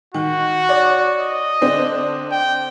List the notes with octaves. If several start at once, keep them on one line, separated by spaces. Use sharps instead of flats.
D#3 F#4
C#5 D5
D#5
D3 C4 D4
G5